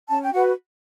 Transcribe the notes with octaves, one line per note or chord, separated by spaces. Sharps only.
C#4 A5
G5
F#4 B4 F#5